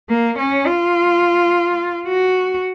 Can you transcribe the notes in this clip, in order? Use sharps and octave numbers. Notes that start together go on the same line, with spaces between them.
A#3
C#4
F4
F#4